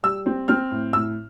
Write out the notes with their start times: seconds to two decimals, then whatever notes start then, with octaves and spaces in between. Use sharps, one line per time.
0.03 G3 E6
0.26 C4
0.48 C4 F6
0.71 A2
0.93 A2 E6